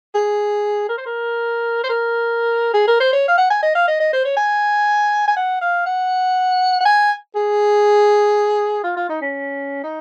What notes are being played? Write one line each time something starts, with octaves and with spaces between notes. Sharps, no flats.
G#4
A#4
C5
A#4
C5
A#4
G#4
A#4
C5
C#5
F5
F#5
G#5
D#5
F5
D#5
D#5
C5
C#5
G#5
G#5
F#5
F5
F#5
F#5
G#5
G#4
F4
F4
D#4
C#4
D#4